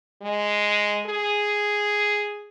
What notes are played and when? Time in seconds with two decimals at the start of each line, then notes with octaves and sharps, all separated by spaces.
0.22 G#3
1.06 G#4